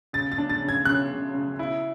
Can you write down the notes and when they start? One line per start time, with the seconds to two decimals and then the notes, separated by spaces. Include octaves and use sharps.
0.13 C#3 A6
0.32 A6
0.38 D4
0.50 A6
0.62 C#3
0.69 G#6
0.85 C#3 F#6
1.10 C#3
1.34 C#3
1.59 E4